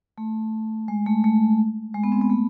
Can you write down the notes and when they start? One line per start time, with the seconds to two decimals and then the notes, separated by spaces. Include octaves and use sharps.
0.18 A3
0.88 G#3
1.06 A3
1.24 A3
1.94 G#3
2.04 B3
2.12 C4
2.21 B3
2.30 A3